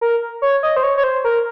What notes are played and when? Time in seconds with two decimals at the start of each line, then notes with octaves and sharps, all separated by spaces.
0.01 A#4
0.42 C#5
0.63 D#5
0.76 C5
0.83 C#5
0.97 C#5
1.04 C5
1.24 A#4